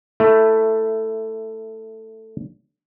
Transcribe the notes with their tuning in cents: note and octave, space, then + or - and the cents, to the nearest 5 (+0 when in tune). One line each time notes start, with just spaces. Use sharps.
A3 +10 E4 +0